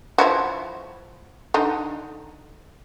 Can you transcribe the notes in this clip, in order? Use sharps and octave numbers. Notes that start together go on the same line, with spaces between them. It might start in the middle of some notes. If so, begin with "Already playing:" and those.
F3 E4 F#4
D3 D#4